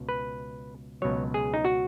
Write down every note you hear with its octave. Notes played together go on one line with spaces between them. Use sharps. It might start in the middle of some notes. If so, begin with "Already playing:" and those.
Already playing: C#2 B2
B4
C#2 B2 F#3 C#5
G#4
D#4
F#4